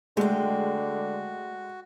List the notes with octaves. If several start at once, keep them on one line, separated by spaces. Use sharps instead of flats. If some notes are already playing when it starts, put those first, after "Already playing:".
D3 G#3 A3 F#4 G5